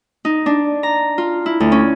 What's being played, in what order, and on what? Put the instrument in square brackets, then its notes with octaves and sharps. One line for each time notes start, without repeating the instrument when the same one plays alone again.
[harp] D#4
D4
A#5
F4
E4
D2
C#4